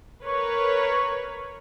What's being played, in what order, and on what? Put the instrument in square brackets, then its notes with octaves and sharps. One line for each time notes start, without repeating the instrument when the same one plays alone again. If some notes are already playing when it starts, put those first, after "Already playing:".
[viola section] A#4 B4 C#5